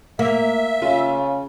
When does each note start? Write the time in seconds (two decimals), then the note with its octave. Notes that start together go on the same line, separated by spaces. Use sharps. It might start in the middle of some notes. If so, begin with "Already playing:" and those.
0.19 A#3 E5
0.82 C#3 F4